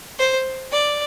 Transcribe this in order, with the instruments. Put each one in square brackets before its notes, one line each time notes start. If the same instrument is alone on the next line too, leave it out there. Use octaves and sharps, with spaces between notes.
[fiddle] C5
D5